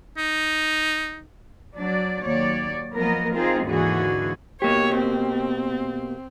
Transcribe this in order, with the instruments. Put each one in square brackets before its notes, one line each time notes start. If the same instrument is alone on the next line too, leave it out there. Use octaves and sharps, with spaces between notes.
[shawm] D#4
[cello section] F#3 D4 D5
D#2 F#3 C#5 D5
F3 F#3 A#3 B3 A#4 D#5
C4 D#4 F4 G#4 A#4 C5
D#2 G#2 D3 E3 F#4 G#4
[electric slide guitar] B2 A#3 G4 [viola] C#5
[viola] C4